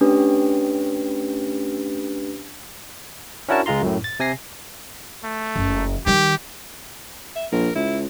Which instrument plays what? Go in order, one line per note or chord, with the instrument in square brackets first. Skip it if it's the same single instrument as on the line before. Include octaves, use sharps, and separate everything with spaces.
[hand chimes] A3 C#4 D4 G4 B4
[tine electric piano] C#4 D4 E4 F#4 A#4 A5
C#2 G#3 F4 A#5 C6
F#2 A2
A6
C3 G#5 A#6 C7
[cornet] A3
[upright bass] F#1
[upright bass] D#3 G3 [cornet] G4
[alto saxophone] E5
[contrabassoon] A#1 [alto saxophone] A#4
[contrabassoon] C#2 [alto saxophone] E4